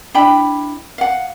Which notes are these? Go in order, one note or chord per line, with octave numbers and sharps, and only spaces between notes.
D4 E4 G5 B5
F5 F#5